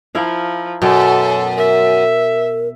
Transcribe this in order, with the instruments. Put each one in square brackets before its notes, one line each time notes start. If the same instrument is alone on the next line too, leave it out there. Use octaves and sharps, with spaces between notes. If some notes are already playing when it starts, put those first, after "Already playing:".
[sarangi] F3 [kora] E4 A#4 F5
[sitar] F#2 [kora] B2 [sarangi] A4
[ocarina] A#4 [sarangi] E5